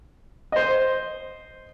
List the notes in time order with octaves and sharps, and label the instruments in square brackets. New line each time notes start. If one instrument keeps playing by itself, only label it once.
[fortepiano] C5 D#5